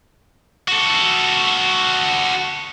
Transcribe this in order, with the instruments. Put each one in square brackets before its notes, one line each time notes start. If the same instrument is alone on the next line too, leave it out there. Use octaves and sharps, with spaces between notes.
[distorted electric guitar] F#4 A4